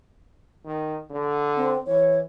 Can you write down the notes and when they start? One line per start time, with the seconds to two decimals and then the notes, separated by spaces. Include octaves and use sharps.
0.65 D#3
1.10 D3
1.56 C4
1.87 E3 C#5